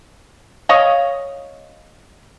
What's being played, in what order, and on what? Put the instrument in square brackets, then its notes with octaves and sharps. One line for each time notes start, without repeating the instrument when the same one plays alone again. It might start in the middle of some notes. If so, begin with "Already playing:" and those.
[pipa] C#5 D#5 F5